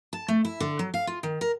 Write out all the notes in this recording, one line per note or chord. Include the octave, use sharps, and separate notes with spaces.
A5
A3
E4
D3
F#3
F5
F4
D#3
A#4